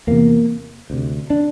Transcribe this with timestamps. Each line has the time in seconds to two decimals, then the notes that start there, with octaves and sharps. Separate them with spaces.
0.07 E2 C3 A#3
0.90 D2 C3
1.30 D4